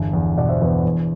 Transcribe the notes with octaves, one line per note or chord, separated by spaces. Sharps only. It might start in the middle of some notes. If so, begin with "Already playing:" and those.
Already playing: G1 E2
E2
B2 D5 F#5
C5 E5
E2 B4 D5
C5
E2